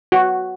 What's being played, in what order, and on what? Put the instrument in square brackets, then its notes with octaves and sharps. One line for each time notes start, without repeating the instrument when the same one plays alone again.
[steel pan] F#4